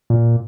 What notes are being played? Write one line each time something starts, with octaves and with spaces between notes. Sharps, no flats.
A#2